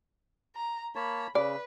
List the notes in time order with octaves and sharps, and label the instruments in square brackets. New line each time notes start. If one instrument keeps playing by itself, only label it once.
[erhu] A#5
[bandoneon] A#3 C#5 A5 [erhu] B5
[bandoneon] C#3 [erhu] B4 [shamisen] D5